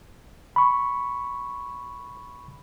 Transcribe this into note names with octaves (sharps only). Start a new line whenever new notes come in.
B5 C#6